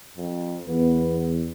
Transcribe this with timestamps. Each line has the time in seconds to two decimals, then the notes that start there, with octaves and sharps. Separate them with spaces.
0.17 F2
0.67 E2 B3